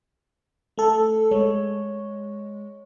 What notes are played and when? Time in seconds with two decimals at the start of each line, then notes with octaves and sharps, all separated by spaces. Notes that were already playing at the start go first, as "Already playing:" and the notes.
0.77 A3 A4
1.31 G#3 C#5